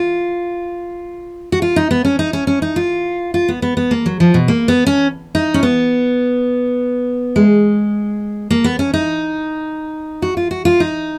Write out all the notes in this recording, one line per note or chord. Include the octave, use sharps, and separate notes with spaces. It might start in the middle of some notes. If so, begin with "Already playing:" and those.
Already playing: F4
F#4
F4
D#4
B3
C#4
D#4
C#4
C#4
D#4
F4
F4
B3
B3
B3
A#3
F#3
F3
B2
A#3
B3
C#4
D#4
C#4
B3
G#3
A#3
B3
C#4
D#4
F#4
F4
F#4
F4
D#4